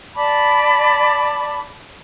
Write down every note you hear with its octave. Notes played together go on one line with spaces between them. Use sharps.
D5 A5 B5 D6